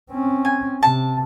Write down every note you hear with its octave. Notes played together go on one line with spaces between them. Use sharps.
C4 C#4
G#5
C3 A5